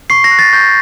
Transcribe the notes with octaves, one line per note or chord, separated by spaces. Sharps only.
C#6 C7
A#6
F#6
A6
C#6 G6